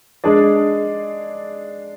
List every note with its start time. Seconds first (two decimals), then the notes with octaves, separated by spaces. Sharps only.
0.24 G#3 D4 G#4 D5